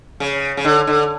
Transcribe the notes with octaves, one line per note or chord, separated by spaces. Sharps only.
C#3
C#3
D3
D3